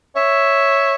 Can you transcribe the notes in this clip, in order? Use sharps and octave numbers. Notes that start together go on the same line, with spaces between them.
C#5 E5